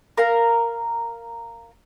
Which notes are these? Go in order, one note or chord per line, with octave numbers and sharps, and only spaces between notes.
A#4 F5 A#5